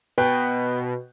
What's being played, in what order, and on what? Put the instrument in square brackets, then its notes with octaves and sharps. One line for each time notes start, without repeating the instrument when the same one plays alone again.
[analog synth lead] B2 [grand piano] B4 G5